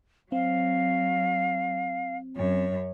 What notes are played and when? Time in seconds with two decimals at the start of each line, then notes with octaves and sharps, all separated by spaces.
0.32 F#3 C4 F5
2.36 F#2 C#5